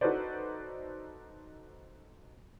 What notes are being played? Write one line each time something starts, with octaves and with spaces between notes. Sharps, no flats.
D#4 F#4 A4 B4 C5 D5